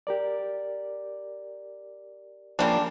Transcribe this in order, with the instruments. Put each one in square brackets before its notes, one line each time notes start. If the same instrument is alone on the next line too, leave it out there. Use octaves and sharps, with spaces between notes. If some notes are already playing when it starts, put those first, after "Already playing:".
[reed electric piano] G4 A#4 D5
[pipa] C#3 G3 D4 [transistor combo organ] F3 A#3